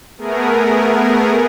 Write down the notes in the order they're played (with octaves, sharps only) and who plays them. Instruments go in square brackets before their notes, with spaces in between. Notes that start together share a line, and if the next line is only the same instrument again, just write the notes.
[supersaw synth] A3 B3 G#4 A#4